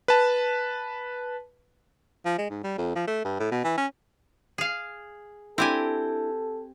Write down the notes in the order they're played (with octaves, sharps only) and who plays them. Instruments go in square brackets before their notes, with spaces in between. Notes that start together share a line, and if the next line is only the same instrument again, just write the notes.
[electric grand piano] B4 A5
[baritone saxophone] F3
G#3
G#2
G3
F2
F3
A3
G2
A2
B2
E3
C#4
[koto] G#4 F5
[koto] C4 G4 G#5 [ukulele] D4 E4 [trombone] A4